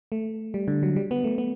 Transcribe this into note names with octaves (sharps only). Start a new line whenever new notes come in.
A3
G3
D3
F#3
G3
B3
A3
B3